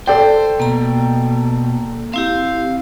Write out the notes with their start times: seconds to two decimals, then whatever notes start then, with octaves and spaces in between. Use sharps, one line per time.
0.07 A4 C5 D5 G5
0.60 B2 A#3 A#5
2.14 C4 E4 G4 F5